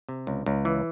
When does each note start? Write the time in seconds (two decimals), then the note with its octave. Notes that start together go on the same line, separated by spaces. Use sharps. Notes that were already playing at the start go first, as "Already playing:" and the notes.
0.09 C3
0.27 C#2
0.46 C#2
0.65 E3